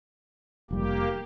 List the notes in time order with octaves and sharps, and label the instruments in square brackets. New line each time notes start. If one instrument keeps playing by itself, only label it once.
[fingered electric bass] F1 G3 [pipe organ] A#3 G4